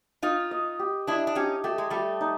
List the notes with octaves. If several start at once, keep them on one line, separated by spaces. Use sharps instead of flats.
D#4 F4 D#5
D#5
G4
D4 E4 D#5
D4
C#4 D#4 G4
A3 G4
G#3
G3 A3 G4
D#4